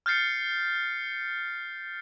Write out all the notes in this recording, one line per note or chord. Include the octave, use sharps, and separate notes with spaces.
F6 G6 A6 C7 C#7